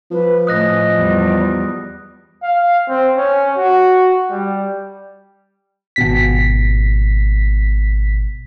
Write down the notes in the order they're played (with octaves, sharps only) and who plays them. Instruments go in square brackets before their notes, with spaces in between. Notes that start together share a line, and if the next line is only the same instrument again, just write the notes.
[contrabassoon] F3 [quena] B4
[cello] A2 C#4 [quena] D#5 [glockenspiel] D#6 F#6 A#6
[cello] E2 G3
[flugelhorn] F5
C4
C#4
F#4
G3
[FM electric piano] G#1 B2 B6